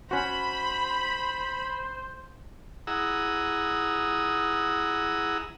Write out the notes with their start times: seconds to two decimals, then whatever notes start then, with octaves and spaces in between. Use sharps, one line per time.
0.11 C#4 F#4 C5 B5
2.87 E4 G#4 F#5 A#5 D#6 E6